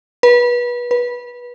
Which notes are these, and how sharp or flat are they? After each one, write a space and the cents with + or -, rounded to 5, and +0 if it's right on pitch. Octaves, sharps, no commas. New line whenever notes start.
B4 -25
B4 -20